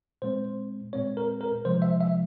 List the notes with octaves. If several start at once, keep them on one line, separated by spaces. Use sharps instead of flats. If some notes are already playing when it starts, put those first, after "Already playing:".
A#2 G#3 C4 C5
A#2 G#3 C4 C#5
A#4
A#4
C3 F3 G#3 C5
E5
E5